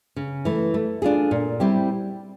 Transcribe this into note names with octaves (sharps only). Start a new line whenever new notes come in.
C#3
E3 A3
A3
D4 F4 G#4
A#2
G3 C4 E4 G4